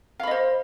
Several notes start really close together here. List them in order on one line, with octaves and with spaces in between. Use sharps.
F5 B5 D#5 C5